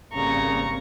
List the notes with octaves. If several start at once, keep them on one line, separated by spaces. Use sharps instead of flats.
G#1 C#3 G3 A#3 C4 A#5 C#6